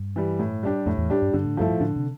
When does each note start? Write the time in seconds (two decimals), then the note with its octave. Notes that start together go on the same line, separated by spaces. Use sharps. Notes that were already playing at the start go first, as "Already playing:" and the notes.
Already playing: G2
0.16 E3 G3
0.39 A2
0.63 G3 D4 G4
0.86 F2 A2
0.98 E2
1.10 G3 D4 G4
1.22 G2
1.33 G2 D3
1.45 A2
1.57 G2 F3 A3 E4
1.68 A2
1.80 A2 D3
1.96 C3